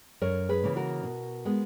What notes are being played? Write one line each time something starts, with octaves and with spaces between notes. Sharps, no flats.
F#2 A#4 C#5
G#4 B4
C#3 E3 A#3 C#4
F#4 A#4
B2
G#3 B3